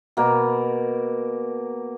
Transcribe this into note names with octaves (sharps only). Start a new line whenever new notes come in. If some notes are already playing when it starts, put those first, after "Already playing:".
B2 A#3